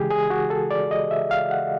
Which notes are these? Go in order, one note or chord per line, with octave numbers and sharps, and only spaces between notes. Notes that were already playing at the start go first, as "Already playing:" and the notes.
Already playing: C#3 E3 G#3 G4 G#4
G#4
F#4
A4
D5
D#5
E5
F5
F#5